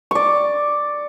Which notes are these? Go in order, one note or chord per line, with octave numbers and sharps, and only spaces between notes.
D5 C#6